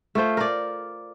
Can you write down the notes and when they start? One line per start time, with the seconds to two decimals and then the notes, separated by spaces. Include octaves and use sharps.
0.15 A3 F4 C5
0.37 A#4 D5